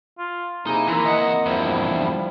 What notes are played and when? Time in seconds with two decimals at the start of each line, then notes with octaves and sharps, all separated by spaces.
0.19 F4
0.67 C3 A#3 D#4 E4 G#4
0.88 E3 A#3 C4 A#4 E5 A#5
1.05 E3 D#5 F#5
1.46 E2 G2 F3 G3 E4